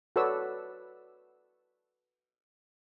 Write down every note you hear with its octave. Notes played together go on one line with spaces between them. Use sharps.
F#4 A4 B4 C#5 D5 E6